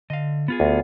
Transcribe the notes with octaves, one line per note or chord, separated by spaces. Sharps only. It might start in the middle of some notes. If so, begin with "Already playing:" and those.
D3 D#5 F5
B3 F4 G#4
D2